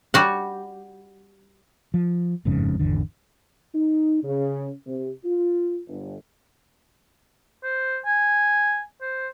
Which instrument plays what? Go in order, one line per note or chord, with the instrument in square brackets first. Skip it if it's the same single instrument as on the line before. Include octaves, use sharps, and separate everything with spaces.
[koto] G3 F#4 F#5
[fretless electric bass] F3
G1 F2 G#2 C#3
G#1 E2 D3
[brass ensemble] D#4
C#3
C3
F4
G1
[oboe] C5
G#5
C5